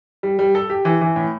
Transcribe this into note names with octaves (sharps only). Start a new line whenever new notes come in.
G3
G3
A4
G4
E3
E3
A2